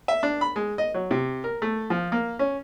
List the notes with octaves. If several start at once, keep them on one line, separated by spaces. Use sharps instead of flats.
E5
D4
B5
G#3
D#5
F#3
C3
A#4
A3
F3
A#3
C#4